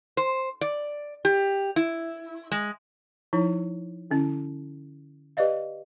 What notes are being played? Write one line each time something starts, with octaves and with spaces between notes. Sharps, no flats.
C5
D5
G4
E4
G#3
F3 D#4 E4 C#5
D3 C#4 E4
G4 B4 D5 D#5 F5